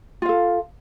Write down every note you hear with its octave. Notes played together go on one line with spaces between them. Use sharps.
F4 A4 F5